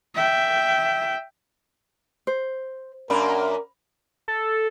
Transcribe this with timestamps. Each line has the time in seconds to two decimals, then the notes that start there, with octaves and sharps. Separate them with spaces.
0.15 E5 G5
2.27 C5
3.10 F#2 A#3 D4 A#4 B5
4.28 A4